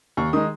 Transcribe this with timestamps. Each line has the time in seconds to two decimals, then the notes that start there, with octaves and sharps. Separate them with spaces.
0.17 D#2 C#6
0.33 D#3 G#3 D#6